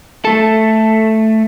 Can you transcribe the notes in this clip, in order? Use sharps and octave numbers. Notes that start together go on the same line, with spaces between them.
A3 A4